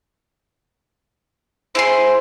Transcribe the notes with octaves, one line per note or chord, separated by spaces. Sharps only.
E4 G#4 C5 C6